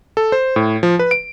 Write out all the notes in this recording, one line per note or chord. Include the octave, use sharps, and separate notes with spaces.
A4
C5
A2
F3
B4
D7